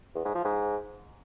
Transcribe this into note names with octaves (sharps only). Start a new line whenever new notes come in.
E2
G#2
F3
G#2